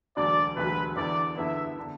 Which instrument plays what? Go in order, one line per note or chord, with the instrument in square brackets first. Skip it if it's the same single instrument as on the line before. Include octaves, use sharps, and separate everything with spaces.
[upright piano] E1 D2 D3 F#3 [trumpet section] D5
[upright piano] E1 D2 D3 F#3 [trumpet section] B4
[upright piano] E2 D3 B3 E4 [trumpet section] D5
[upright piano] E2 D3 B3 E4 [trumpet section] E5
[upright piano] D3